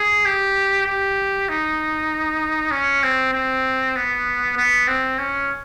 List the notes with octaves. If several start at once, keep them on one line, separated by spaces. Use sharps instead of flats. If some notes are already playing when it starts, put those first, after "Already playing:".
Already playing: G#4
G4
G4
D#4
C#4
C4
C4
B3
B3
C4
C#4